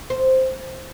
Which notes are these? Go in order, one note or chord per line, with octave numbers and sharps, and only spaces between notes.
C5